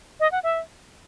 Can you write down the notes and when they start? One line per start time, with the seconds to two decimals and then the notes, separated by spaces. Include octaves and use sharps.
0.20 D#5
0.32 F#5
0.43 E5